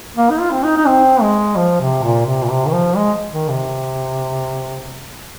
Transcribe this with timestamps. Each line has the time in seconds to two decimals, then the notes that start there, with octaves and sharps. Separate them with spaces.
0.17 A#3
0.30 D#4
0.40 F4
0.51 C4
0.63 D#4
0.77 D#4
0.87 C4
1.22 G#3
1.56 F3
1.80 C3
2.03 A#2
2.26 C3
2.43 A#2
2.50 C3
2.66 D#3
2.73 F3
2.96 G#3
3.32 D#3
3.49 C3